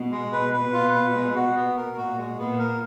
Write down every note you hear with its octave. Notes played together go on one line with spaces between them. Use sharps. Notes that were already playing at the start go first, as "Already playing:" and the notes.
Already playing: B2
G#3
B2 B4
B4
F4
B4
G#3
F#4
B3
A#4
A#2 F#4
G#3
A#2 B3
A#4